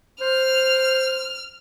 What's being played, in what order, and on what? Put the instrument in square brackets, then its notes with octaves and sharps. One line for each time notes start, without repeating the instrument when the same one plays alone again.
[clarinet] C5 [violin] F6